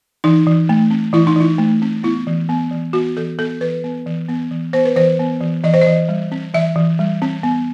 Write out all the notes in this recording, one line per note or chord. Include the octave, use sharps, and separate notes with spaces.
E3 D#4
E3
A3
C4
E3 E4
D#4
E3 E4
A3
C4
B3 E4
E3
B3
E3
B3 F#4
E3 A4
B3 A4
E3 B4
B3
E3
B3
E3
B3 C5
B4
E3 C5
B3
E3
E3 D#5
C5
D#5
E3
G3
C4
E3 E5
E3
G3
C4
B3